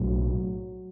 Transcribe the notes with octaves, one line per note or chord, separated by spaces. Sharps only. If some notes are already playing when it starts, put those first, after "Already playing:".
Already playing: B1 A2 F#3